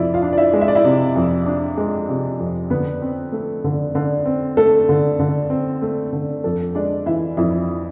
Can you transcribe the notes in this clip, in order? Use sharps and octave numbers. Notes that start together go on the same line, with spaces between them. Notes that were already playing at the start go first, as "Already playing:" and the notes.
Already playing: F2 C3 E4 F4 D5 E5
F4 F5
D4
D5
E4 E5
G#3
E5
D5
E4 E5
C3
F2
D4
G#3
C3
F2
D3 B3 B4
C4
A3
D3
D3
C4
A3 A4
D3
D3
C4
A3
D3
F2 A4
G#3 D4 D5
E3 E4 E5
F2 E4 E5